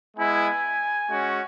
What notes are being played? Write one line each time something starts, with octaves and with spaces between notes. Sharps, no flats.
G#3 B3 E4 G#5
G#3 C#4 F#4